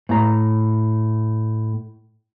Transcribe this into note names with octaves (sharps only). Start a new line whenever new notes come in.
A2 A#5